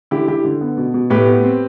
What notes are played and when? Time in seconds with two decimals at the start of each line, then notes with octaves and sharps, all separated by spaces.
0.11 D3 E4 G4
0.28 D3 E4 G4
0.45 D3
0.61 B3
0.77 B2
0.94 B2
1.10 A2 G4 B4
1.27 B3
1.43 C4